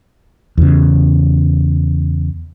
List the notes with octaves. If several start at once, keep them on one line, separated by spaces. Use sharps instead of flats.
E2 C#3